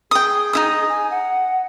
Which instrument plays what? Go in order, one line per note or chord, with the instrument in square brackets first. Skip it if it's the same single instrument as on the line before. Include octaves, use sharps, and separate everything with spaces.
[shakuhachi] G#4 [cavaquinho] G5 D#6
[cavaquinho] D#4 E4 D#6
[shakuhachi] G#5
F#5